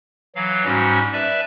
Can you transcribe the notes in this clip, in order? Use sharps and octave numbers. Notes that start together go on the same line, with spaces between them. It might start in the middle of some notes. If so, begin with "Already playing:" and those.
E3 F#3 F5
G#2 G3 C#4 F#4
B4 D5 E5 A5